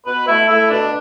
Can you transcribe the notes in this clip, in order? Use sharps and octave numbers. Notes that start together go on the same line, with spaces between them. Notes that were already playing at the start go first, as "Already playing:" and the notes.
B2 B4
A3 E4
A3 E4
B2 D4